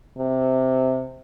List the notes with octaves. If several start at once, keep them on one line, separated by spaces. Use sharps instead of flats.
C3